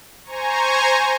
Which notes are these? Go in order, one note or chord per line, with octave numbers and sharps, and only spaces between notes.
C5 G#5 A#5 C#6